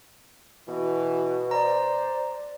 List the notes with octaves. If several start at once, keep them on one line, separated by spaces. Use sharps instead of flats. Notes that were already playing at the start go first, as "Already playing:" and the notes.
B2 E3 F#4
C5 D5 A#5